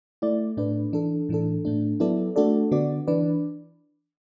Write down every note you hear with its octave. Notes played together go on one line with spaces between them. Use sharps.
A3 E4 D5
A2 A3 D4 B4 D5
E3 D4 A4
A2 E3 D4 A4
A2 A3 D4
F#3 B3 E4 A4 D5
A3 D4 F#4 A4 D5
D3 B3 F#4 D5
E3 D4 B4 D5